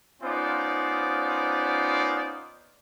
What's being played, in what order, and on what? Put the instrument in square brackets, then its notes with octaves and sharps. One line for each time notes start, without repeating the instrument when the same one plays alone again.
[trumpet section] B3 C#4 D#4 F4 C5 D5